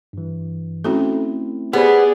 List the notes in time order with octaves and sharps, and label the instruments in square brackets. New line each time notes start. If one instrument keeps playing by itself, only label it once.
[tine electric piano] G2 E3
[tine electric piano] A3 C4 E4 [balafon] C#4 F#4 A4
[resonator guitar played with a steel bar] B3 [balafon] G4 C5 B5 [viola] G#4 D5